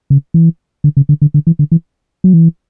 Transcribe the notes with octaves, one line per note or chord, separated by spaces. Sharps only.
C#3
E3
D3
C#3
D3
D3
D3
E3
D3
E3
F#3
E3